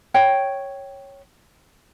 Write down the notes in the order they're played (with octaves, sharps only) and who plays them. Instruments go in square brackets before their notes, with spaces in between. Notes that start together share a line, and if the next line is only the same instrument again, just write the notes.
[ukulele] C#5 G5